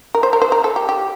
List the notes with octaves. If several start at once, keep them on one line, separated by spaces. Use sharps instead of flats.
A#4
C5
A#4
C5
A#4
A4
G4
G4